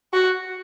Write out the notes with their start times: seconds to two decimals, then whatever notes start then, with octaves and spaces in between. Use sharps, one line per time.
0.13 F#4